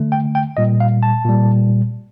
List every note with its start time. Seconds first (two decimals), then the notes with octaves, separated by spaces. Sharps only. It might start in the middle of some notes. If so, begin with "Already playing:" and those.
Already playing: D3 A3
0.12 G5
0.35 G5
0.57 A#2 G3 D#5
0.80 F5
1.03 A5
1.25 A#2 G3